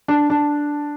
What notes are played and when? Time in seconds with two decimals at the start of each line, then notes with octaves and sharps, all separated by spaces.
0.08 D4
0.30 D4